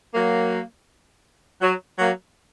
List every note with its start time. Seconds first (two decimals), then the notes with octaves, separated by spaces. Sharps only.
0.14 F#3 A#3
1.62 F#3
1.99 F#3 A#3